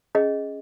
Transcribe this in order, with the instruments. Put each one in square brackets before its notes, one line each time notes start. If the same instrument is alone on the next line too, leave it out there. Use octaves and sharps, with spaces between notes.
[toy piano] C#4 G#4 D#5